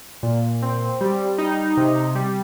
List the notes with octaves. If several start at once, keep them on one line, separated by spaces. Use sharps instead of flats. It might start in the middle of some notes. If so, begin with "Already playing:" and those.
A#2
C4
G3
D#4
C3
G3